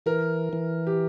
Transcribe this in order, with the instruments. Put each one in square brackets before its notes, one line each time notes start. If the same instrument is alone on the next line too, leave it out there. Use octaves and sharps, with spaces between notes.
[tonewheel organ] E3 [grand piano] A#4
[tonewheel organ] E3
[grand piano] G4